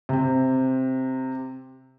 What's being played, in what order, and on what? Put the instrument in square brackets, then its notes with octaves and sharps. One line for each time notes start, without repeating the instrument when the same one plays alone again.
[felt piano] C3 C4